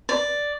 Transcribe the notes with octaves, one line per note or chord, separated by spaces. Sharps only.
D5